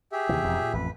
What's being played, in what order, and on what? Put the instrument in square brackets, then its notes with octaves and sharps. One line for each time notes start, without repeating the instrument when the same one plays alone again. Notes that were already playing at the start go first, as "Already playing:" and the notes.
[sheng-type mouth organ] G4 G#4 E5
[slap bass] D#2 C3 E3
E1 F2
A#2
[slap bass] A1 F2 [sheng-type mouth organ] B4